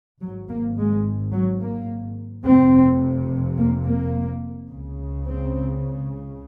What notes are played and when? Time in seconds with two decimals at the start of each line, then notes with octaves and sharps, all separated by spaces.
0.21 G#1 G#2 F#3
0.49 A#3
0.77 G#3
1.33 F#3
1.61 A#3
2.45 F1 F2 C3 C4
3.57 A#3
3.85 A#3
4.69 C#2 C#3
5.25 C4